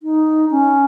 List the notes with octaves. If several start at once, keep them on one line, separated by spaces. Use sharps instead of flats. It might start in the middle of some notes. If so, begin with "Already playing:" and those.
D#4
C#4